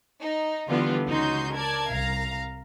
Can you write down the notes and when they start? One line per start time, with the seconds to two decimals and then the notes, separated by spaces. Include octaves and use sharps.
0.22 D#4
0.67 D3 E3 G3 B3 F4
1.06 C#2 C#4 D#4 F#4 C6 G6
1.54 A#4 D5 A5 G#6
1.89 C2 F5 A#5